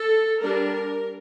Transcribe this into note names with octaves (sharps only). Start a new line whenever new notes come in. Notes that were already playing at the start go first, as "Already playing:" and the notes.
Already playing: A4
G3 D4 A#4